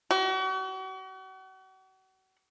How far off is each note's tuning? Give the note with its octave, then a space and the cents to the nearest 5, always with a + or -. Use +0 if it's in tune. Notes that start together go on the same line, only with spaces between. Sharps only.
F#4 +40